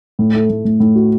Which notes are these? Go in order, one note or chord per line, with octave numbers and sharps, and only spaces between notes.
A2
A3
A2
A2
A2
F#4